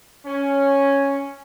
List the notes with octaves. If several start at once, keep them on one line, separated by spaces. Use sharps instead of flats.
C#4